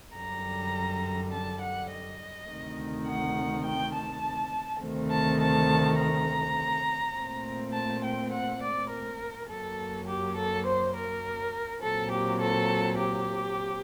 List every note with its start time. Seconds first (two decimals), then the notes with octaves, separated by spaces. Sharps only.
0.15 F#2 D3 G3 A#5
1.32 A5
1.61 F#5
1.89 D#5
2.48 D2 C3 D#3
3.07 F#5
3.65 G5
3.95 A5
4.82 D2 C3 D#3 A3 C4
5.10 A5
5.40 A5
5.98 A#5
7.15 A#2 A3 C4
7.73 A5
8.03 G5
8.32 F#5
8.61 D5
8.90 A#4
9.49 F#2 F#3 A#3 A4
10.07 G4
10.36 A4
10.65 C5
10.95 A#4
11.81 A#2 F#3 C4 A4
12.10 G4
12.40 A4
12.98 G4